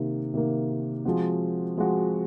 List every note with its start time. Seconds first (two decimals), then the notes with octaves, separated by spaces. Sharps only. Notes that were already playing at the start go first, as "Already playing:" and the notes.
Already playing: C3 D#3 A#3
0.34 C3 D#3 A#3
1.05 F3 G#3 C4 F#4
1.77 F3 G#3 C4 F#4